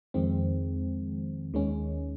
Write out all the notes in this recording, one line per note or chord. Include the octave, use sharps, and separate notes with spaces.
F2 D#3 G#3 C4
D#2 D#3 G#3 C#4